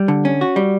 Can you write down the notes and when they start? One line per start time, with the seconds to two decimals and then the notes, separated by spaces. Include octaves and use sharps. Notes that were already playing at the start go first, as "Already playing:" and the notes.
Already playing: G3
0.08 D3
0.25 C#4
0.41 F#4
0.56 G3